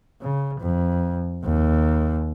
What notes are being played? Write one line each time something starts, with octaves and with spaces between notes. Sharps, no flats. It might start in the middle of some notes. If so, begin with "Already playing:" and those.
C#3
F2
D#2